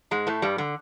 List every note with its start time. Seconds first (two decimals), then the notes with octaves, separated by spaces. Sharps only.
0.11 G#2 G#3
0.27 A2 A3
0.42 G2 G3
0.58 D3